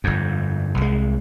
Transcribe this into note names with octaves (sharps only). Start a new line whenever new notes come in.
G1 F2
C2 G#3